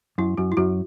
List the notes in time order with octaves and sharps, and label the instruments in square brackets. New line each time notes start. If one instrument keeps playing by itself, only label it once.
[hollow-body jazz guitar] F#2 [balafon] E4
[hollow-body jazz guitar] F#2 [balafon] F#4
[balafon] E4
[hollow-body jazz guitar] F#2 [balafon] F#4